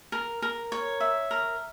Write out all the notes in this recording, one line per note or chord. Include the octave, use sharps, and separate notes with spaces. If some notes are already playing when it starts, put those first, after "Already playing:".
A#4
A#4
C#5
E5
A#4